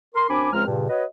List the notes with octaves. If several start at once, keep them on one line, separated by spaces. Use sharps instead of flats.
A#4 C6
F#2 C4 D4 G#5 B5 D6
C#2 F3 G#3 C4 A#5 F6
G2 A#2 C#3
F#4 B4 C#5 D#5